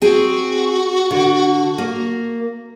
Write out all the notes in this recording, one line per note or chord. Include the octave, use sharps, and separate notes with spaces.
C4 F#4 G#4
D3
A#3